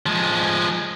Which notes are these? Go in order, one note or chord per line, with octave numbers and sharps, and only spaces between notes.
F3 G#3